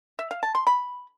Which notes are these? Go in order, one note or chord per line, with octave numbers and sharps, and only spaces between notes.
E5
F5
A5
C6
B5